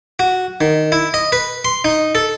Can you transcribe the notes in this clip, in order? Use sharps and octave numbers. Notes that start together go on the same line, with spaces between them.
F#4
D#3
E4
D#5
B4
C6
D#4
A4